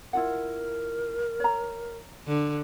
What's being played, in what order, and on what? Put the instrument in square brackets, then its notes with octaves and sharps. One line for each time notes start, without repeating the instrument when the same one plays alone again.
[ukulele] E4 F4 F#5 [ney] A#4
[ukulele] C#5 A#5
[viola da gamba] D3